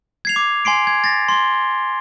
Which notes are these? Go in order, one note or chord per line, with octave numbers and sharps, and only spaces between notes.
G#6 C7 F7
D6
G#5 C6 C7 D7
G#6
A6 A#6
C6 G7